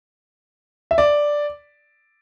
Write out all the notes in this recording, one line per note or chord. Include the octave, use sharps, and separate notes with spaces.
E5
D5